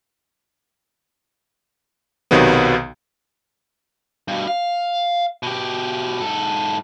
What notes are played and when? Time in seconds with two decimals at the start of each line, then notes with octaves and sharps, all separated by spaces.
2.31 B1 C3 D#3 F#3 B3
4.28 G2 B2
4.47 F5
5.43 B2 G4
6.21 G#2 A4